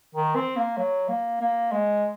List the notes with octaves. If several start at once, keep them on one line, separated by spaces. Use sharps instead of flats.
D#3
C4
A#3
F#3
A#3
A#3
G#3